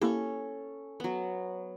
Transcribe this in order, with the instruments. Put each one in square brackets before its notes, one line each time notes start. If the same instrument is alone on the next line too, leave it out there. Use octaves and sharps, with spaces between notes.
[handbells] A#3 E4 G4 [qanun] C#4 A4
[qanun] F#3 B3